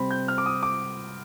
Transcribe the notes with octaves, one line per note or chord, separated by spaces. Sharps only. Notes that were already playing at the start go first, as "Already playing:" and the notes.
Already playing: C3 G3 C4 B5
G6
F6
D6
D#6
D6